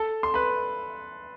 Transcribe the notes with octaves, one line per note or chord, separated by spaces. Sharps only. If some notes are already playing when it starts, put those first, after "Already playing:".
Already playing: A4 A5
C6
B4 B5